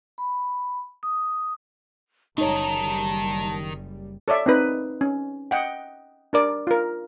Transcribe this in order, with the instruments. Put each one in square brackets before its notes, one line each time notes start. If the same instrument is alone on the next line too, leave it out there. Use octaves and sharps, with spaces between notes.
[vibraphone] B5
D#6
[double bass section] F#1 G3 [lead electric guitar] D#3 A#4 [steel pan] D#4 C#5 [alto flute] A5
[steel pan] A4 C#5 D5 E5
C4 D#4 B4
C#4
D#5 F#5 G5
D4 A#4 D5
F4 A#4